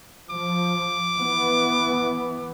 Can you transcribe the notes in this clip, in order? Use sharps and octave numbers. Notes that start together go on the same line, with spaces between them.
F3 D6
E3 B3